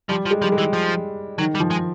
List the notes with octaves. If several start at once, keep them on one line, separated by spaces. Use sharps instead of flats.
F3 G3
F3
G#3
F3 G3
G#3
E3
F3
D#3 F#3
G3
F3
G#3